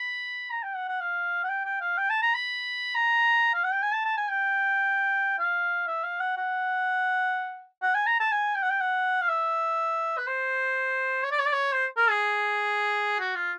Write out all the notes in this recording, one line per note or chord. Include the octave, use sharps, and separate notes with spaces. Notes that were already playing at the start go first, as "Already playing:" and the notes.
Already playing: B5
A#5
G5
F#5
F#5
F5
F#5
G5
G5
F5
G5
A5
A#5
B5
A#5
F5
F#5
G5
G#5
A5
A5
G#5
G5
F5
E5
F5
F#5
F#5
F#5
G#5
A#5
A5
G#5
G5
F#5
G5
F#5
F5
E5
B4
C5
C#5
D5
C#5
D5
C#5
C5
A#4
G#4
F#4
F4